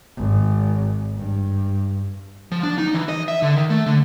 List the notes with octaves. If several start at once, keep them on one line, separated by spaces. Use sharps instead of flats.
G#1
G2
F3
D4
D#4
E3
D#5
E5
D3
D#3
A3
D3